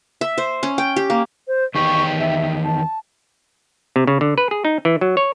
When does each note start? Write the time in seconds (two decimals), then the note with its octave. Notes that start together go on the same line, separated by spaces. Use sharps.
0.21 E5
0.38 C5
0.63 C#4
0.78 G5
0.96 G4
1.10 A#3
1.48 C5
1.75 E2 D#3 G4 C#6
2.19 E5
2.64 A5
3.96 C3
4.07 C#3
4.21 D3
4.38 B4
4.51 G#4
4.65 D#4
4.85 E3
5.01 F#3
5.17 C#5